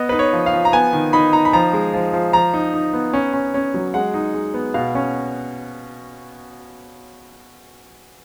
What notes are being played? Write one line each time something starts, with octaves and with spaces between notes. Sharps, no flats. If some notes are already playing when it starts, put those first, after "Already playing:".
Already playing: B3 D#5
D#4 B4
C#5
F3
F5
F3
A#5
B3 G#5
D#3
D#4 B5
D#4 A#5
B5
F3 A#5
G#3
F3
F3
F3 A#5
D#4
D#4
B3
C#4
C#4
C#4
F#3
G#3 F#5
D#4
G#3
B3
B2 F5
C#4